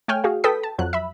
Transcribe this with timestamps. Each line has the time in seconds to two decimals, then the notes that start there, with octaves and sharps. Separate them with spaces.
0.08 A3 C#5 G5 G#5 F6
0.24 F#4 G#4 F5
0.44 A4 B4 G5 D#6 B6
0.63 A5
0.78 F2 F#3 F#6
0.93 E5 B5